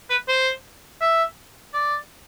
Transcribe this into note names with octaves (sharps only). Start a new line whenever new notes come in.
B4
C5
E5
D5